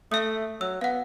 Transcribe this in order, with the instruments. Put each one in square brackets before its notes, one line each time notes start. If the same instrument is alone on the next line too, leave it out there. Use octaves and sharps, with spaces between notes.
[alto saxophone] A3 [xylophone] E5 D#6
[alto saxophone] F#3 [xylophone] E6
[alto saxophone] B3 [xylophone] F5 F#5